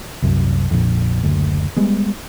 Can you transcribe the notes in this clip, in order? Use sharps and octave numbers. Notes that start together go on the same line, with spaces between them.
C2 F#2
A#1 F2
F#1 D2
G3 G#3 B3